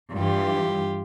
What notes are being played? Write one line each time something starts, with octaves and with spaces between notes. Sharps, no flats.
G2 E3 F4 G4